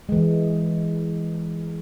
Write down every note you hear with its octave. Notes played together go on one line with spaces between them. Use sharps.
E3 G#3